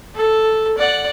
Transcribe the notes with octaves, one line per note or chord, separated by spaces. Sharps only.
A4
D5 F#5